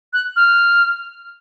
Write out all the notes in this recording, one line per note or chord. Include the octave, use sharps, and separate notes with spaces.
F#6
F6